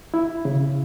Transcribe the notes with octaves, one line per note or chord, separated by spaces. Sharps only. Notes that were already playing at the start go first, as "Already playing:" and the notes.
E4
C#3